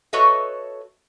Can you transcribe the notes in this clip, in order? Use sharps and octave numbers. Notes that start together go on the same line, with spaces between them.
F#4 A4 B4 C#5 D#5 E5